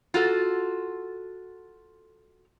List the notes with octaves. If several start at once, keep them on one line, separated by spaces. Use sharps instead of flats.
F4 F#4 A4